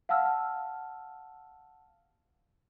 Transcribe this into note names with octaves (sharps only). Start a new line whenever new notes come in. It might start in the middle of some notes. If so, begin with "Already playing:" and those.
F5 F#5 A5 E6 F6